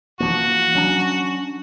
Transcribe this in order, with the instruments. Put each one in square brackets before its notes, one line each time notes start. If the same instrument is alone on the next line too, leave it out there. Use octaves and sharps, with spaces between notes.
[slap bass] E3 F3 A#3 [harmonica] F#4
[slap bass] F#3 C#4 D4